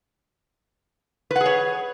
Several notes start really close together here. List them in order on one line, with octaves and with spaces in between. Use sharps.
B4 F#5 G#4 C#5